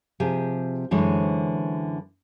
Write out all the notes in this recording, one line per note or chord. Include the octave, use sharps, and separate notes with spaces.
C3 F3 G4 G#4
F#2 D3 E3 G#3 C5 C#5